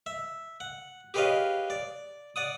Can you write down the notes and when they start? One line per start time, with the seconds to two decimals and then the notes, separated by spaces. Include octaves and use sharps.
0.06 E5
0.60 F#5
1.14 G4 G#4 B4 C#5 D#5 F5
1.70 D5
2.36 D5 F#5 D#6